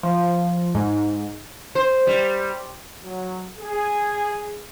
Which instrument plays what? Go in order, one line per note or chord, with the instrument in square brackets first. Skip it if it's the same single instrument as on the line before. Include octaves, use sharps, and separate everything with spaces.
[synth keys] F3
G#2
[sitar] C5
G3
[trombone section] F#3
G#4